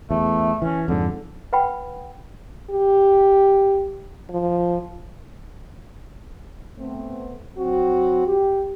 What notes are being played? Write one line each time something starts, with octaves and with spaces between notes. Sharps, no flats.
E2 A3
E3 C#4
F2 G#2 D3
B4 F#5 G5 B5
G4
F3
A3 B3 C4
F#3 C4 F#4
G4